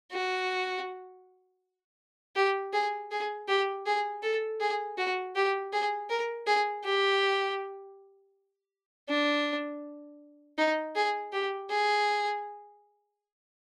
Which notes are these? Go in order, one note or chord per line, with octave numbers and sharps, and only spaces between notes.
F#4
G4
G#4
G#4
G4
G#4
A4
G#4
F#4
G4
G#4
A#4
G#4
G4
D4
D#4
G#4
G4
G#4